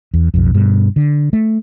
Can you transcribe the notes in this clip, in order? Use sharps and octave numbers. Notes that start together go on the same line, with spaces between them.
E2
B1 F2
G2 B2
D3
A3